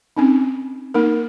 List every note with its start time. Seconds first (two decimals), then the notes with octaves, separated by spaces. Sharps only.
0.17 C4 C#4 D#4
0.94 A#3 D#4 A#4